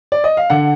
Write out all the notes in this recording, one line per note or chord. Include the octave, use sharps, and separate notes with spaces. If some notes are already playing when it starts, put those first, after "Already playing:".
D5
D#5
F5
D3 F#5